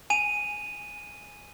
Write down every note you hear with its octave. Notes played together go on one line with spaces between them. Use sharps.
G#5 D#7 F7